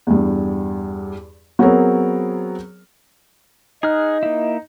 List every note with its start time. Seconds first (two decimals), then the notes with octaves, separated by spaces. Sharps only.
0.07 E2 G2
1.59 F#3 B3 C4 G#4 A#4 C#5
3.83 D#4 G#4 D#5 F6 F#6
4.23 A#3 E4